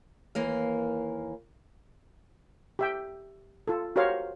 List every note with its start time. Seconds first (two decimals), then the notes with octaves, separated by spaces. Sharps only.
0.35 D#2 E3 A#3 F5
2.79 G4 E5 G5
3.68 F4 A4
3.96 F#4 G4 A#4 C5 C#5 F5